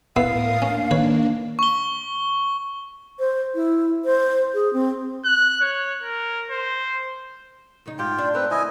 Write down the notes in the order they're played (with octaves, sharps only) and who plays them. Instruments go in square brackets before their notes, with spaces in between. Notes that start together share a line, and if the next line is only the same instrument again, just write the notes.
[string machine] A2 A#4 D#6 [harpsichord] B3 E4 B4 [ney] F5 [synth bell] C7
[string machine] A#3 D4 [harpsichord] C#4
[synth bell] D#3 [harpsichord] B4 C#5
[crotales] C#6 G7
[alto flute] C5
E4
C5
G#4
C4
[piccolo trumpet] F#6
C#5
A#4
C5
[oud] E2 C#3 D#4
[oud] G#2 G4 [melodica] F4 G5
[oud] D4
[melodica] C4 B4 [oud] D4 A#4
[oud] D2 [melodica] E4 D#5 G#5